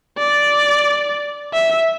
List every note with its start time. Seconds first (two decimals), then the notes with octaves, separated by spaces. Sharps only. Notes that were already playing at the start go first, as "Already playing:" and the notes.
0.18 D5
1.54 E5